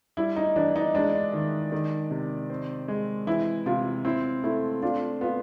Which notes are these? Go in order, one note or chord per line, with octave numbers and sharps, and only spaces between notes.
G3 E4
D#4
E3 D4
D#4
G#3 D4
D#3
D#3
C3
C4
G#3
E3 E4
C3 F4
C4 E4
A3 E4
D4 F4
B3 F4